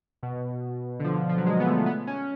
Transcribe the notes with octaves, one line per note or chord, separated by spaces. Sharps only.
B2
D3
F3
F3
F#3
G#3
B3
A3
B3
C#4